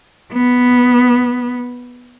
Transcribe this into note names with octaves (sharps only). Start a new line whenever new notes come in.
B3